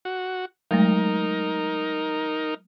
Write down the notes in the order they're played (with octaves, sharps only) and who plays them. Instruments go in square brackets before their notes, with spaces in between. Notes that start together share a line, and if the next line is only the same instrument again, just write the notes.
[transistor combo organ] F#4
[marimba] F#3 G#3 A3 [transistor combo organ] D#4 A#4